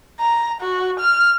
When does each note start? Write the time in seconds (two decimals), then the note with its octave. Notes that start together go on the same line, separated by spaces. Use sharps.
0.20 A#5
0.61 F#4
1.00 F6